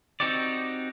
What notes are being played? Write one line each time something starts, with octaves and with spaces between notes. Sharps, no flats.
C4 D#4 F#4 G4 D5